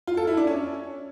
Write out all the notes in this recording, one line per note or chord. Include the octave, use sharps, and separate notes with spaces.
F4
A4
E4
D4
C#4